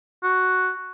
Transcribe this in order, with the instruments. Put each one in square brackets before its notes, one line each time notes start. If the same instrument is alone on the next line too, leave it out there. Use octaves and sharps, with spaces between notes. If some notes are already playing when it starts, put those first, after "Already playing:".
[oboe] F#4